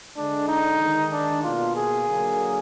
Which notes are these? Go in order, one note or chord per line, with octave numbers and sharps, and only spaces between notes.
D3 G#3 D4
D#4
D#3 G#3
D4
B2 A#3 F4
G#4
D3 F#3 A#3